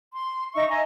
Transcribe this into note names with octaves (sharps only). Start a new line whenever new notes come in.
C6
D#4 E5 C#6
D#5 E5 G#5 A#5